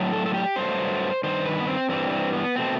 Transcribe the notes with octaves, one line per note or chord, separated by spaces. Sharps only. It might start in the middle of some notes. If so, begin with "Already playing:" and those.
Already playing: A2 F#3 A3
A4
A4
G4
G2 F#3 A3 C5
G2 D#3 C5
B4
B3
C4
G2 E3 G3 C4
C4
B3
B2 A3 C4